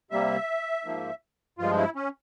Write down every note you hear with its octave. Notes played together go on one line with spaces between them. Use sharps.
C3 G3 A#3 E5
G#2 F3 A#3
G2 F3 G#3 F4
E4
C#4